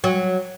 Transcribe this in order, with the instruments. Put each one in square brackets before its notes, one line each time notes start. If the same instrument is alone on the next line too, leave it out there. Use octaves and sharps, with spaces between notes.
[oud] F#3